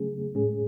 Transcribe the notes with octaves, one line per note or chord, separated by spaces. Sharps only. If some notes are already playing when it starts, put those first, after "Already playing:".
Already playing: C#3 F#3 A3 C#4 G#4
A2 G#3 C#4 G#4